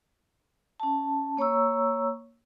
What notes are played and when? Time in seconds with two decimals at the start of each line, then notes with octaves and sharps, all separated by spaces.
0.80 C#4 A5
1.37 A#3 C#5 A#5 C#6 E6